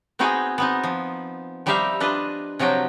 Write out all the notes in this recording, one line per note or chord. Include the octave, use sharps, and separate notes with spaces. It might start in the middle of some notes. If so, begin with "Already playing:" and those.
B3 C4 D#4 F#4 G#4 G5
B3 C4 D#4
F3
F3 G3 D#4 G4 E5 F5
D4 F4 B4 D#5
C3 F3 F#3 F#4 G5